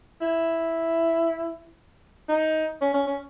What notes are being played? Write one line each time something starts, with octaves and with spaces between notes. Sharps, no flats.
E4
D#4
C#4
C#4
C#4